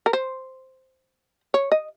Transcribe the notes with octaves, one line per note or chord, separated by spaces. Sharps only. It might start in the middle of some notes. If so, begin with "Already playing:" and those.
A#4
C5
C#5
D#5